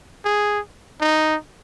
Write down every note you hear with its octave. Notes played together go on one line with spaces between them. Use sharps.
G#4
D#4